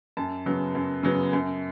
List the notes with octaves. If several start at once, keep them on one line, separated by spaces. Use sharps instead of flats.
F#2 A5
C#3 F#3 B3
F#2
C#3 F#3 B3
F#2